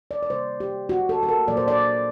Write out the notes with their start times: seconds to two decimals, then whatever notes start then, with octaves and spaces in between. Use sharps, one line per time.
0.11 D5
0.23 D5
0.30 C3 D#3 G3 A#3 C5
0.60 G4
0.89 F#4
1.09 A4
1.23 A4
1.29 A#4
1.48 A#2 F#3 A#3 D5
1.57 C5
1.68 D5